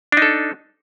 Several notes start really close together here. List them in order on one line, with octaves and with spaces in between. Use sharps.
D4 D#4 A4